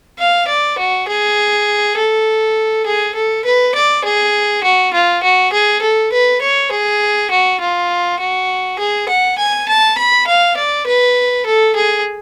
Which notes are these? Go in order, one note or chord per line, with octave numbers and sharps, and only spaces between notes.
F5
D5
F#4
G#4
A4
G#4
A4
B4
D5
G#4
F#4
F4
F#4
G#4
A4
B4
C#5
G#4
F#4
F4
F#4
G#4
F#5
G#5
A5
B5
F5
D5
B4
A4
G#4